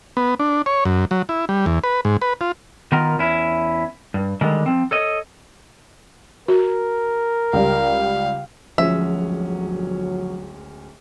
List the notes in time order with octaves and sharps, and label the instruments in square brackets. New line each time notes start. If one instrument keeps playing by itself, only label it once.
[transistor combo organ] B3
D4
C#5
F#2
F#3
E4
G3
E2
B4
G#2
B4
F4
[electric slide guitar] D#3 B3 F4 A#4
E2 C#4 E4
G2
D3 D#3 G3 G#3
F3 C4
A4 C#5 D#5
[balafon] F#4 [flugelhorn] A#4
[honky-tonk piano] C#2 G3 [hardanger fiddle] F5
[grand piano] D1 G#3 C#4 [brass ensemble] G1 F#3 [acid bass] F3 [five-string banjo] E5